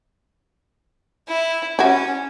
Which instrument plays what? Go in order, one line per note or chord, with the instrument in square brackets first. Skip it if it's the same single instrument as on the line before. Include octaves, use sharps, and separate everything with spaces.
[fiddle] E4
[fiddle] C#4 [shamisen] E4 F#4